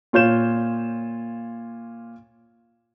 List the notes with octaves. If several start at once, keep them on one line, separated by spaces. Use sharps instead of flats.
A#2 F4 C#5 G6 E7